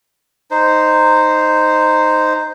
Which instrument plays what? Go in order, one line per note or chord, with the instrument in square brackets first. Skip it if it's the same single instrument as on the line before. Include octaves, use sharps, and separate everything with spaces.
[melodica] D#4 C5